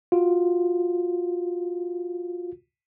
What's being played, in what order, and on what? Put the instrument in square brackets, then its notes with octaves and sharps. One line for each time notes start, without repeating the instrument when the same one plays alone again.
[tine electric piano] F4 F#4